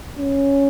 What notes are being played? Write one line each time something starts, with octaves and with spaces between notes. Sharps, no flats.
C#4